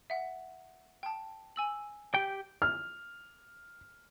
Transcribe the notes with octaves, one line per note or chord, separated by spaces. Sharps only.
E5 F#5
G5 A5
G#5 E6 F#7
G4 G5
F6